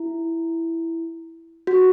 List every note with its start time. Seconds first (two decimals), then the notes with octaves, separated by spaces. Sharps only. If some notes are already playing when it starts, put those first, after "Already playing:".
Already playing: E4
1.67 F#4